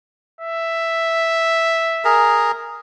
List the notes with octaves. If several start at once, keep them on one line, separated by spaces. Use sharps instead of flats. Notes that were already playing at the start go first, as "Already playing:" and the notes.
E5
G#4 A#4